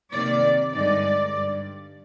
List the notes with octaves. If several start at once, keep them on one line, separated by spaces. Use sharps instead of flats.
C3 D#3 A#3 D5
G2 D3 G#3 D#4 D5
G2